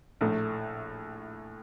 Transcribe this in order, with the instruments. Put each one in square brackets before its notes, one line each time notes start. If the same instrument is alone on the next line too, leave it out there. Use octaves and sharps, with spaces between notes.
[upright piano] A#1 A2 A3